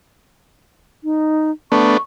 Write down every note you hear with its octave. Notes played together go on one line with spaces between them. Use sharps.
D#4
A3 B3 D4 C#6